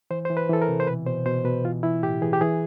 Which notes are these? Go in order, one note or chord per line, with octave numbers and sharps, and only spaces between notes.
E3 C5
E3 C5
B4
E3 A4
A#4
C3
C5
B2 B4
B2 C5
B2 C5
B2 B4
E3 F4
E3 E4
A2 G4
E3 G#4
G4
E3 G#4